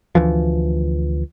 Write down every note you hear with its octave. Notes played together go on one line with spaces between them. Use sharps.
D2 E3 F3